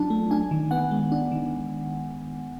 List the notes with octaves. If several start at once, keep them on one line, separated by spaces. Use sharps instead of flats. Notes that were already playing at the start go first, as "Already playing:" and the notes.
Already playing: F#3 D4 F4 A5
A3
D4 G#5
D#3
B3 F#5
G#3
D4
D#3